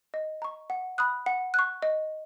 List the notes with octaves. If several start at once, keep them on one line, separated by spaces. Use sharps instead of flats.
D#5
A#5 C#6
F#5
B5 D#6 F#6
F#5
C#6 F#6
D#5